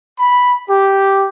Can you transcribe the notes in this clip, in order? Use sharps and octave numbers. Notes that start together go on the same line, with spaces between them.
B5
G4